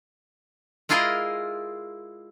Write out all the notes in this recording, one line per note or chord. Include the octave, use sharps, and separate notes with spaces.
G#3 E4 F4 G#4 A#4 D#5